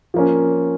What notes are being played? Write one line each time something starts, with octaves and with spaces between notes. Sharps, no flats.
F3 A#3 C#4